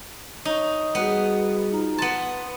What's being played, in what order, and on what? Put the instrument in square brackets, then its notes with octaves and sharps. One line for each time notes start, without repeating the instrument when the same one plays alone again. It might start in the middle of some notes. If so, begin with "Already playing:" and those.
[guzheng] D#4 [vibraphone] C#5 C#6
[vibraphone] G3 F#4 G#4 [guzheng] B3
[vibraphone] D#4 F4 A#5
[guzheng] B3 A5 [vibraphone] C6